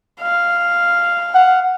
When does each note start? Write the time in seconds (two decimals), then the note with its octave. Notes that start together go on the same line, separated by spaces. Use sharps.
0.22 F5
1.35 F#5